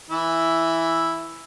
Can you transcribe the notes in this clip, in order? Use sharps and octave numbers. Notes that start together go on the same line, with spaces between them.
E3 E4